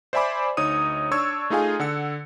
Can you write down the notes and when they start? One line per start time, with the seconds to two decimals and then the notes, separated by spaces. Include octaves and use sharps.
0.13 C5 D5 E5 G#5 B5 D6
0.57 D2 D#4 C#5 D#6 D#7
1.11 D4 C#5 C#6 E6 G#6
1.50 A3 D#4 F4 G#4 F5 G#5
1.80 D3 F#5 E6 C#7